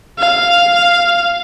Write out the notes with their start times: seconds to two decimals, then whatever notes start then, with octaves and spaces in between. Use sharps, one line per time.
0.19 F5